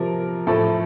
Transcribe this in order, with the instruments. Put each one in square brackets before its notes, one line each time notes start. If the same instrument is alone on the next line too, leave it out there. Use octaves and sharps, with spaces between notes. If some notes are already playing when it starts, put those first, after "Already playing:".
Already playing: [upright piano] C3 F3 A#4
A2 F3 A4